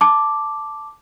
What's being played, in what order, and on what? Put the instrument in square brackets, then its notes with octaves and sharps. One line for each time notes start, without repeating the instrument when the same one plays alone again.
[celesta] A5 D6